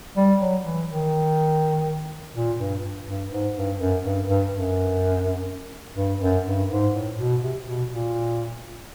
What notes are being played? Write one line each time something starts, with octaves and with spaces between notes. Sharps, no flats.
G3
F#3
E3
D#3
A#2
G2
G2
G2
G#2
G2
F#2
G2
G2
F#2
G2
F#2
G2
G#2
A2
B2
C3
B2
A#2